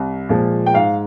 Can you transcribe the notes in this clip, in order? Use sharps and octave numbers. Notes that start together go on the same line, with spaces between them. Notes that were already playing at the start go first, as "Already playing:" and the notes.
Already playing: C2
A#2 F3 G#3
G5
G#2 F5